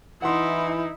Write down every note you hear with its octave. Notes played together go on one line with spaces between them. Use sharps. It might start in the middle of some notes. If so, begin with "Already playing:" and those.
E3 D#4 E4 F#5 C6